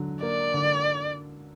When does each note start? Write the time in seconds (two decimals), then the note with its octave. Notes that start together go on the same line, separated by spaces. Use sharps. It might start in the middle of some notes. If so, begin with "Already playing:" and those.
Already playing: D3 F#3
0.23 A#3 D5
0.54 D3